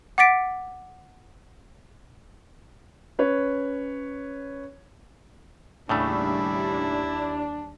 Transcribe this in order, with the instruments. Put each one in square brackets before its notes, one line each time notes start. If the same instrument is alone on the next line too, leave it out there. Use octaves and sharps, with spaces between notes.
[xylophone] F#5 D6 A6 B6 D7
[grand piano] C#4 B4 C#5
[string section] D#2 G3 [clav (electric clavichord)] A2 C#3 A3 [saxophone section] D4 [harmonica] E4